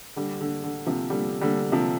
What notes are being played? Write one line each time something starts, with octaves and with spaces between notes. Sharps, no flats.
D3 G3
D3
D3
C3 F3
D3 G3
D3 G3
C3 F3